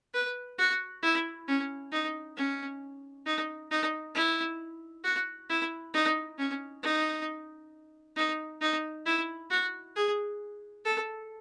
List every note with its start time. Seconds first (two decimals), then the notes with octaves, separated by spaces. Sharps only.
0.14 B4
0.58 F#4
1.03 E4
1.48 C#4
1.92 D#4
2.37 C#4
3.26 D#4
3.71 D#4
4.15 E4
5.04 F#4
5.50 E4
5.94 D#4
6.38 C#4
6.83 D#4
8.17 D#4
8.61 D#4
9.06 E4
9.50 F#4
9.96 G#4
10.85 A4